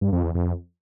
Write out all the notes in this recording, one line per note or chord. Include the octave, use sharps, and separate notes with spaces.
G2
F2
E2
F2